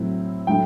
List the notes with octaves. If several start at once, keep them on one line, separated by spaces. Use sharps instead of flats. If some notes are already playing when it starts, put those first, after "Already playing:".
Already playing: A2 F#3 C4 E4
A2 F#3 A3 E4 G5